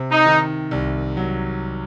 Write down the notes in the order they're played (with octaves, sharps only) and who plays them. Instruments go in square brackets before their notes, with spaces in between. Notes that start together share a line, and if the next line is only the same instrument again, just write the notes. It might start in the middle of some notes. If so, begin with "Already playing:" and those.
Already playing: [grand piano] C3
[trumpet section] D#4
[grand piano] D#3
C2
F#3